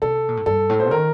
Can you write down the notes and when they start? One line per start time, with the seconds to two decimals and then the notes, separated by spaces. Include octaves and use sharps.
0.02 C3 A4
0.29 A#2
0.37 A2
0.46 G2 A4
0.69 A2
0.80 C5
0.91 D#3 A#4